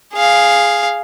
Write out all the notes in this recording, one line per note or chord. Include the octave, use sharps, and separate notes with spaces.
G#4 F5